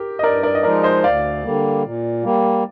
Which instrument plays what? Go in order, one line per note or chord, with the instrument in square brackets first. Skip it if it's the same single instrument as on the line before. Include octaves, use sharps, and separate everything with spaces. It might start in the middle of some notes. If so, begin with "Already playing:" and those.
Already playing: [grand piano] G4 A#4
D#5
[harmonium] G2 [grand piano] A#4 D5
[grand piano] A#4 D5
D#5
[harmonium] F3 G#3 D#4 [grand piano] A#4 D5
[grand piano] C5 D#5
[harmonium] D2 [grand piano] D5 F5
[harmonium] D3 G3 A#3
A#2
G3 A#3